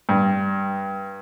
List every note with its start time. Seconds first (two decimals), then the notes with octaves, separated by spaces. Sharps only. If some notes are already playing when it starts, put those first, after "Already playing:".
0.09 G2